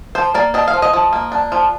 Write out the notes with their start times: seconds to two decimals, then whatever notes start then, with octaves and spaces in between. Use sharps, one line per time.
0.15 F3 C5
0.34 A#3 D5
0.54 D4 D#5
0.68 F5
0.74 F3
0.82 D#5
0.93 F3
1.13 A#3
1.32 D4
1.52 F3